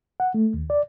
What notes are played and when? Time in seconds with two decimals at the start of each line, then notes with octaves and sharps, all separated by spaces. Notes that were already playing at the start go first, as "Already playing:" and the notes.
0.20 F#5
0.34 A3
0.54 D#2
0.70 D5